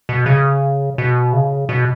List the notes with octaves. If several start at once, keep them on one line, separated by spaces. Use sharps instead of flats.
B2
C#3
B2
C#3
B2